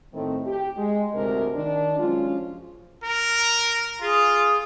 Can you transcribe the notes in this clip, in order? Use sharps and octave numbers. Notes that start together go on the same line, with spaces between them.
A2 D#3 A3 C4
G4
G#3
D2 G#2 C3 G#3 D4 A#4
D#3 D4
F3 F#3 G#3 C#4 F4
A#4
F4 G#4